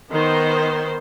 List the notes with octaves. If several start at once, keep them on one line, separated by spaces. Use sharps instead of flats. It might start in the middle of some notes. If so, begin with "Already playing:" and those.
D#3 B3 C5